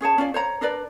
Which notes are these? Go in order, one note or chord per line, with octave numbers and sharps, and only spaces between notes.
C#4 G#4 C#5 A5
C#4 F4 D5
C5 C#5 A#5
D4 A#4 B4 D5